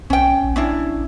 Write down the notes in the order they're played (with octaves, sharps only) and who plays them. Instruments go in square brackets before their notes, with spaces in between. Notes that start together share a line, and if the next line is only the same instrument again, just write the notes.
[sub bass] B1 [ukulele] C#4 G5
[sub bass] A#1
[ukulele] C#4 D4 E4